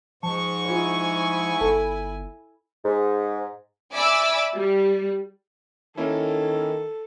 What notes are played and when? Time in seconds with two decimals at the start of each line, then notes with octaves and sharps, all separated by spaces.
0.23 G#2 F3 A5 C#6
0.66 E4 F4 C5 G#5
1.60 G1 A4 A5
2.83 G#2
3.92 D5 E5 G#5 B5 D6 E6
4.54 G3
5.97 D#3 A#3 C#4 E4 A4